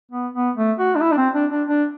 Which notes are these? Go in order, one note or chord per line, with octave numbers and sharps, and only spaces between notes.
B3
B3
A3
F#4
D4
E4
D4
C4
D4
D4
D4